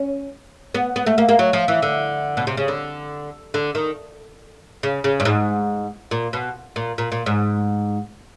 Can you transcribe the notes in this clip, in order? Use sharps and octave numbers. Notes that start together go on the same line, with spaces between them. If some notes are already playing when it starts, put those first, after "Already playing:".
Already playing: C#4
B3
B3
A3
A#3
A#3
F#3
F3
E3
D3
B2
C3
C#3
D3
D3
D#3
C#3
C#3
G2
G#2
A#2
B2
A#2
A#2
A#2
G#2